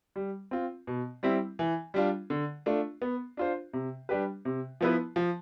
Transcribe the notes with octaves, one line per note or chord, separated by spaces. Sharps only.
G3
C4 F4
B2
G3 C4 E4
E3
G3 D4 F4
D3
A3 D4 F4
B3
D4 F4 C5
C3
G3 D4 G4 B4
C3
F3 B3 E4 B4
F3